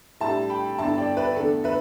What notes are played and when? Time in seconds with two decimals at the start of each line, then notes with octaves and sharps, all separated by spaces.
0.21 A2 G3 D4 E5 A5
0.50 G5 B5
0.78 G2 D3 B3 E4 E5 A5
0.97 D5 G5
1.17 B4 E5
1.36 E2 D3 A3 A4
1.64 B4 E5